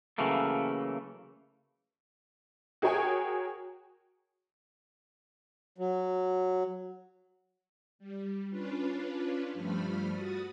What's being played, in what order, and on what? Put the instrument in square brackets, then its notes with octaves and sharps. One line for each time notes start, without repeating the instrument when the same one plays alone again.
[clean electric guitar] C#3 E3 F#3 A3 A#3
[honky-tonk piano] F#4 G#4 A#4 C#5 G5 G#5
[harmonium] F#3
[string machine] G3
C#4 D4 F4 B4
G2 F3 G3 A3 B5 F6
F#4 D#6 A6